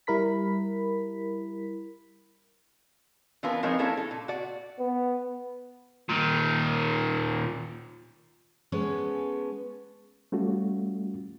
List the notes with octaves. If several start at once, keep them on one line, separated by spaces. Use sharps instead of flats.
G3 E4 A#4 B5 B6
E3 B3 D4 F4 A#4 B4
F3 G#3 C4 D#4 A#4 C#5
A#3 C#4 D4 E4 A4 C#5
A4
A#2
F#4 D5
B3
A#2 D#3
G#3 B3 C#4 A4
G3 A3 C#4 F4 F#4